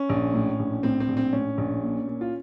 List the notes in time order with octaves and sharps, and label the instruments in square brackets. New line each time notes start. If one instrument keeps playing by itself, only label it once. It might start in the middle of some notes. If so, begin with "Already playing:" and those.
Already playing: [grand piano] C#4
A#1
A2
A#1
A2 C4
C4
A#1
C4
A2 C#4
A#1
A#2
A#2
F4